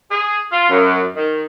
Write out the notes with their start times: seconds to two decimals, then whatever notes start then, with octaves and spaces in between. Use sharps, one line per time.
0.12 G#4
0.51 F4
0.69 F#2
1.16 D#3